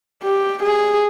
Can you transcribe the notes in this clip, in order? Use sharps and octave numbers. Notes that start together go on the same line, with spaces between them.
G4
G#4